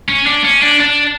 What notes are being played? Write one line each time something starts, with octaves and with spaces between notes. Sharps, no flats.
C#4
D4
C#4
D4
D4